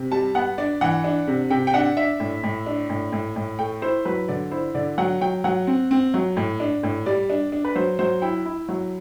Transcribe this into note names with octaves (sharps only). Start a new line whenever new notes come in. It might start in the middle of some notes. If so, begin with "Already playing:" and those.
Already playing: C3
G3 A5
B3 F#5
D4 D5
E3 F#5
D4
C3
C3 G5
G5
D4 F#5
D4 E5
A2
A2
D4
A2
A2
A2
A3 G5
E4 C5
F#3 B4
D3 D5
E4 C5
D3 D5
F#3 F#5
F#3 G5
F#3 F#5
C4
C4
F#3
A2
D4
A2
G3 D5
D4
D4
B4
F#3 C5
F#3 C5
E4 G5
E4
F#3